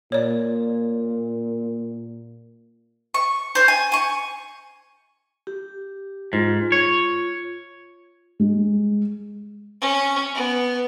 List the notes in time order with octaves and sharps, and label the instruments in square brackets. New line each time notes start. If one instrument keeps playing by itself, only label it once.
[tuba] A#2 [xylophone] C#5 D5
[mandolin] C#6
C5 C#5
G#5
G#5 C#6
[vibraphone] G4
[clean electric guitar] G#2 [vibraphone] F4
[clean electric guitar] C#5
[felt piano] G#3
[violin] C#4
B3